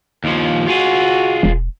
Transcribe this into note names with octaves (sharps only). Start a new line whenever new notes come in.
D#2 F3
F4 F#4 G#4
E1